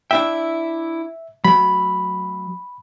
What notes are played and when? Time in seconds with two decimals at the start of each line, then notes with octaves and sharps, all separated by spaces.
0.11 D4 E4 E5 G5
1.44 F#3 A3 B5